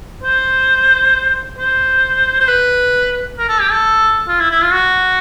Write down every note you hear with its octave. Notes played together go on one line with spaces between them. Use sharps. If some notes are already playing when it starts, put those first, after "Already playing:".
C5
C5
C5
B4
A#4
A4
G4
A4
F4
E4
E4
F4
F#4